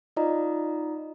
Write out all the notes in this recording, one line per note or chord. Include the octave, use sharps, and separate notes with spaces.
D#4 F4 D5 D#5 A#5